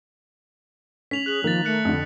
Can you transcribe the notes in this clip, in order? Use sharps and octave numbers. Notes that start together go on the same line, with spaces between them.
C#4 B6 F7 F#7
G#4 F#6 F#7
D#3 F3 A#3 A6 F7
A3 F#6 C#7
F2 D3